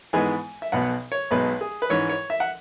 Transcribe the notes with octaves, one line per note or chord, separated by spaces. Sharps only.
G#2 E3 G#3 B3 G#5
E5
B1 B2 B3 F#5
C#5
B1 B2 G#3 B3 B4
G#4
B4
G#2 E3 C#4 C#5
C#5
E5
F#5